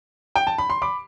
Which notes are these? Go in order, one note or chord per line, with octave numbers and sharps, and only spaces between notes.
G5
A5
B5
C6
B5 D6